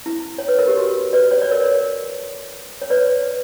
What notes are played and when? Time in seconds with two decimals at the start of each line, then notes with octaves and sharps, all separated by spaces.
0.06 E4
0.38 C#5
0.48 B4
0.59 A#4
0.68 G4
0.77 F#4
1.13 B4 D5
1.31 C#5
1.42 D5
1.51 A#4 C#5
2.82 C#5
2.90 B4 D5